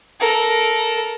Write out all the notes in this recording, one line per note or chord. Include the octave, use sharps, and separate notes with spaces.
A4 A#4